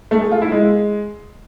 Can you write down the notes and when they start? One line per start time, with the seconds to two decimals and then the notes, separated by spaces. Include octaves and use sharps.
0.11 A3
0.21 G#4
0.32 F4
0.42 E4
0.52 G#3